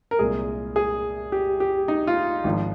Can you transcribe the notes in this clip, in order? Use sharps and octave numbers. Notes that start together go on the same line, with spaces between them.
A#4
C2 A#2 G#3 G#4
G#4
G4
G4
D#4
F4
G#1 G#2 F3